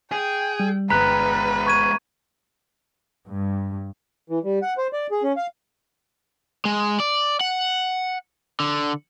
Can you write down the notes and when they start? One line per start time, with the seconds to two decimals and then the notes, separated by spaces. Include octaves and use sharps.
0.12 G#4 G5
0.60 G3
0.90 G1 G#3 B3 B4 A#5 F#6 B6
1.66 C#6 G#6 D#7
3.27 G2
4.30 E3
4.44 G3
4.62 F#5
4.78 C5
4.93 D5
5.11 G#4
5.23 C#4
5.36 F5
6.65 G#3
7.00 D5
7.41 F#5
8.60 D3